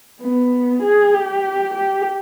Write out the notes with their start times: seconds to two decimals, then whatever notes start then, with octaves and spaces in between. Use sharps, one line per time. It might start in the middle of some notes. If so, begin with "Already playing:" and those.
0.22 B3
0.83 G#4
1.14 G4
1.74 G4